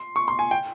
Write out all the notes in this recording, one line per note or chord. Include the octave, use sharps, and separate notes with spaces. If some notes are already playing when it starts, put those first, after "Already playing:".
Already playing: C6
C#6
C6
G#5
G5